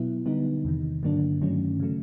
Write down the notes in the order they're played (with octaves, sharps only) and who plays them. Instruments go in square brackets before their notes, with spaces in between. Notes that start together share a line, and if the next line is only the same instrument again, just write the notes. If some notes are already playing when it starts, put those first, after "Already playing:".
Already playing: [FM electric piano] B2 F#3 B3 E4
D3 G3 B3 D#4
E2 C3 D#3
G2 D3 F#3 A#3 D4
G2 D#3 F#3 A3 C#4
C#3 F#3 A3